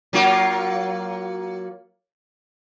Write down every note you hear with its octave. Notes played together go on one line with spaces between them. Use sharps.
F#3 A#3 F4